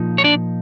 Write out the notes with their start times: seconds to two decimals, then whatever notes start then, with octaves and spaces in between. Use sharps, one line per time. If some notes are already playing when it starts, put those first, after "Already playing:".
Already playing: A#2 F3 D#4
0.18 C#5
0.24 D4 D5